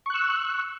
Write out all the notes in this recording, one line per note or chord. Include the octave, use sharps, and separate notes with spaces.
C#6 E6 F#6